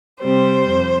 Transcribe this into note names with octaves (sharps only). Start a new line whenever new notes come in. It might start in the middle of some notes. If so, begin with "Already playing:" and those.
C3 G3 C4 C5
F2